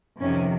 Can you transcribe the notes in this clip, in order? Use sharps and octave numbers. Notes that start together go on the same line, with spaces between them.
F2 C3 D#3 C#4